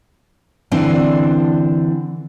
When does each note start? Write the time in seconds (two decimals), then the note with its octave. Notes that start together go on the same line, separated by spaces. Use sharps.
0.72 D3 E3 C4 D4